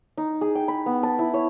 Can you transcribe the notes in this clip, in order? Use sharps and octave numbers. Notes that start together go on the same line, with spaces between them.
D#4
G#4
G5
B5
B3
A5
E4
C#5